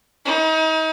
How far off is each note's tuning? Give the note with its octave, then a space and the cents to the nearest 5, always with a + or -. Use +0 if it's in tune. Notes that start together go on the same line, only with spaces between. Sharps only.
D#4 +35